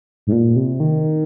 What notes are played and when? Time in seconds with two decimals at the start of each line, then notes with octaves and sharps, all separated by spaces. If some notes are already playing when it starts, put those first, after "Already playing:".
0.27 G#2
0.32 A#2
0.56 C3
0.80 D#3